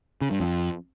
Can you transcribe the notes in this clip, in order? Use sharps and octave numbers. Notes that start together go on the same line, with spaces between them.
C#3
G2
F2